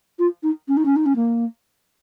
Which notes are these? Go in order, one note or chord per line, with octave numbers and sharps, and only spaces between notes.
F4
D#4
C#4
D#4
C#4
D#4
C#4
A#3